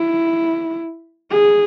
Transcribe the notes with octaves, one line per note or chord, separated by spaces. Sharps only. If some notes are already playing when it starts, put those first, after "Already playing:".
Already playing: E4
G#4